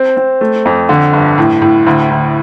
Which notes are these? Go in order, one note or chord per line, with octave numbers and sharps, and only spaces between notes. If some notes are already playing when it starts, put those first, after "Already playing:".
Already playing: C4
C4
A3
F2
D3
G1
A2
A2
D2
D2